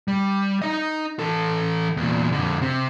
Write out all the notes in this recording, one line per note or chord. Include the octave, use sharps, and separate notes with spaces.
G3
D#4 D#5
E3 A4
E2 A#2
F2 D3
C3